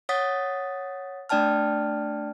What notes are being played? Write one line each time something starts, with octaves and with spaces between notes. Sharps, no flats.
C#5 F#5 D#6 A6 B6
A3 D4 D5 G5 A5 F6